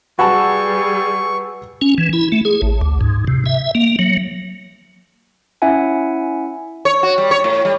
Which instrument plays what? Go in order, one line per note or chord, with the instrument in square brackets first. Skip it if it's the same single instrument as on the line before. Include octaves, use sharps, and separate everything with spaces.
[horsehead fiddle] G3 G#4 [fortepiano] F#4 A5 [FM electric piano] B4 G#5 E6 [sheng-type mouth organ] C#6
[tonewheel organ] C#4
E3
E4
A3
G#4
A1
D2
G#2
C3
E5
A#3
F#3
[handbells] C#4 E4 E5 F#5 G#5
[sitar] C#5
F#4
G3
C#5
A2
G3